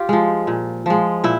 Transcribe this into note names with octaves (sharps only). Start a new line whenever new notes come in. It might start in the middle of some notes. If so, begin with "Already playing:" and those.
Already playing: F4 G4
F3 G#3
A#2
F3 G#3
A#2 E4